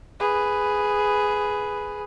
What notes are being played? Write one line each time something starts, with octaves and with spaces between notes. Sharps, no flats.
G#4 B4